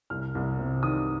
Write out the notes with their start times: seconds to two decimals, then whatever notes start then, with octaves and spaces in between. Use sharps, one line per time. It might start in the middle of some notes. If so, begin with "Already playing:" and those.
0.10 C2 F6
0.35 C2
0.59 C3
0.83 D#3 D#6